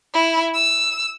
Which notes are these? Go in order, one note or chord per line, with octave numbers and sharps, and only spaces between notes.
E4
E6